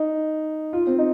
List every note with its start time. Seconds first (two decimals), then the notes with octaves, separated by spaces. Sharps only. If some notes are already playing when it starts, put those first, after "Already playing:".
Already playing: D#4
0.73 F4
0.87 C4
0.98 D#4